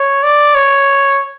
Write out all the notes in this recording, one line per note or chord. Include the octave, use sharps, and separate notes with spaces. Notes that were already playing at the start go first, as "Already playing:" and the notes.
Already playing: C#5
D5
C#5